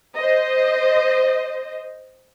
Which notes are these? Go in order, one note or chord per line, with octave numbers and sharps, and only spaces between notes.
C5 D#5